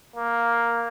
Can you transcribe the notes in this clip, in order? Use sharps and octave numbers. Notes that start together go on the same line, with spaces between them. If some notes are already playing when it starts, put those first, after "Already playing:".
A#3